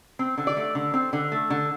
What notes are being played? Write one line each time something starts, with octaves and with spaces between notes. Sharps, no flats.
C4
D3
D5
A3
D3
C4
D3
A3
D3